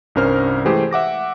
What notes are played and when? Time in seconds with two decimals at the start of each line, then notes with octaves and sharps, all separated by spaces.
0.15 C2 G2 C#4 A#4 C5 F6
0.65 E3 G#3 A3 G4 G#4 C5
0.91 E5 F#5 D6 A#6